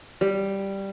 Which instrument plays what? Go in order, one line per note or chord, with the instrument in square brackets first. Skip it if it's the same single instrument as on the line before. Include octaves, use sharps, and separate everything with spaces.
[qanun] G3